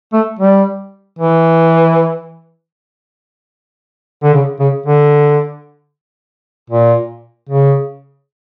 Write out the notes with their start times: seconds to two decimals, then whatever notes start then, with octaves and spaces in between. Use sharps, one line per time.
0.13 A3
0.39 G3
1.19 E3
4.23 D3
4.34 C#3
4.60 C#3
4.86 D3
6.70 A#2
7.49 C#3